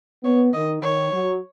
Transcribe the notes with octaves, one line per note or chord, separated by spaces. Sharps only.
B3 C#5
D#3 D#5
D#3 C#5
F#3